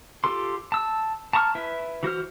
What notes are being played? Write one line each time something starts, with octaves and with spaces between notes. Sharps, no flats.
F4 G4 A4 C6
A5 E6
A5 A#5 C#6 D#6 F6
E4 B4 E5
E3 F#4 C5 F6